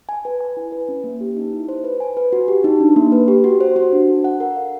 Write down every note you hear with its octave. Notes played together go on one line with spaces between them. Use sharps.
G#5
B4
G#5
E4
B4
C#4
A#3
G4
D#4
E4
C5
B4
G#5
B4
F#4
G4
D#4
D4
A#3
B4
G4
F#4
C5
F#4
D4
A4
F#5
A#4
F5